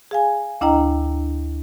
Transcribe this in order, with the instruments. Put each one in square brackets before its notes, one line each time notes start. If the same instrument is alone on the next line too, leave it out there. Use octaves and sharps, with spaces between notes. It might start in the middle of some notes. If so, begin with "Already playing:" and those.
[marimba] G#4 F5 G#5
D2 D4 E4 D#5 G5 A#5